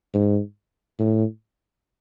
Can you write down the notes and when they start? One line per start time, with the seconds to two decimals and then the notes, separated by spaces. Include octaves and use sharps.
0.14 G#2
0.99 A2